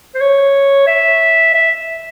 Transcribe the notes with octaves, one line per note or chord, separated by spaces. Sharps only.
C5
C#5
E5
E5